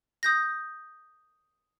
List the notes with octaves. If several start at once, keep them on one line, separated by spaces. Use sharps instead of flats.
D#6 G6 A#6